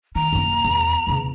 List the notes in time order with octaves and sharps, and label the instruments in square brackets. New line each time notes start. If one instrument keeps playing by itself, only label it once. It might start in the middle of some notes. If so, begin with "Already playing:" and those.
[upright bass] D#3 [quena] A#5
[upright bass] F#2 A#3
E2
E2 C#3